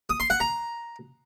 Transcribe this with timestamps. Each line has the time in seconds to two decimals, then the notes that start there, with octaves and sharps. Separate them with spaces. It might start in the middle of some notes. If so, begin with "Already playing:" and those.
0.10 D#6
0.20 C6
0.30 F#5
0.40 A#5